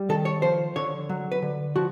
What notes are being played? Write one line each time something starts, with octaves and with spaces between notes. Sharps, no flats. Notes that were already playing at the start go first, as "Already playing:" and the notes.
Already playing: G3
D#3 A4
C#5
F3 C5
D3 C#5
F#3
B4
D3
F3 F#4